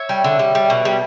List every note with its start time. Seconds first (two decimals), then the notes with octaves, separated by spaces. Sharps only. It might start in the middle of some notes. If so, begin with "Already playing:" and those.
Already playing: C#5 E5
0.09 G3
0.24 D3
0.39 G3
0.55 G3
0.70 B2
0.85 G3